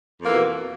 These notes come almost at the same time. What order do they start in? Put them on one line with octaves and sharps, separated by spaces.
F2 A#3 E3 B2